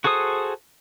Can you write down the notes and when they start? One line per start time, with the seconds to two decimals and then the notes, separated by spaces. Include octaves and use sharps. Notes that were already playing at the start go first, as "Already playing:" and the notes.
0.04 F#4 G#4 A4 C5 D#6